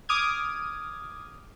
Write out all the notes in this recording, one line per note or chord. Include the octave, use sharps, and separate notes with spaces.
D6 D#6 F6 G#6